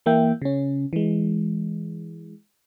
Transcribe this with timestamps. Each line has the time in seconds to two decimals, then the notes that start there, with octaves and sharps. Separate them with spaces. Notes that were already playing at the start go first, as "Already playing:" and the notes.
0.06 E3 A#3 E5 G5
0.42 C#3 C#4
0.93 E3 G#3